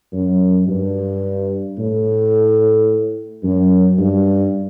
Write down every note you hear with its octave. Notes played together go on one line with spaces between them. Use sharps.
F#2
G2
A2
F#2
G2